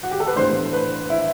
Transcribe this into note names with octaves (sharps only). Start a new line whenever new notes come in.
F#4
G4
A4
B4
A2 E3 B3 D4 C5
B4
E4